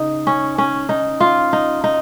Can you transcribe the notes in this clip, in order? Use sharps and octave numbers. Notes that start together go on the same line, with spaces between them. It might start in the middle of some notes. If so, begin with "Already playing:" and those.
Already playing: C#3 D#4
C#4
C#4
D#4
F4
D#4
D#4